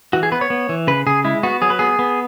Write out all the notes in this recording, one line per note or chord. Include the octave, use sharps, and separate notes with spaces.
E3 F#4
G#4
B3 B4
C#5
B3
E3
C#3 B4
C#3 G#4
G#3 E4
B3 F#4
F#3 G#4
B4
B3 G#4
B3